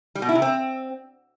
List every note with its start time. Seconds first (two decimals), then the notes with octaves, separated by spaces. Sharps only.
0.15 G3
0.22 B2
0.29 E4
0.35 C3
0.42 C4